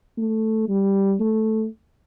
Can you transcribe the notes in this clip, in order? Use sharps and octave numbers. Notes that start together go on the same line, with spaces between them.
A3
G3
A3